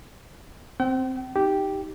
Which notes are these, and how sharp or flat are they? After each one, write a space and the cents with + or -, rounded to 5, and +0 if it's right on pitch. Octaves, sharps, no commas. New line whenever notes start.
C4 +0 G5 -40
D#4 +5 G4 -5